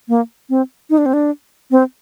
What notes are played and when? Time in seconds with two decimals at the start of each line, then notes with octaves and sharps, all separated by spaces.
0.09 A#3
0.50 C4
0.90 D#4
0.98 D4
1.06 C4
1.13 D4
1.71 C4